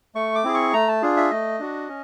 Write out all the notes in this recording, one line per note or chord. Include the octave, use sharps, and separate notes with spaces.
A3 C#6
D6
C4 E4 G#4
C#6
A3 A#5
A5
D4 F4 G#4
E5
A3 D#5
D4 F#4
C#4